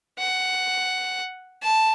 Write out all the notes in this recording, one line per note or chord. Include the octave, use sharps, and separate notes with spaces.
F#5
A5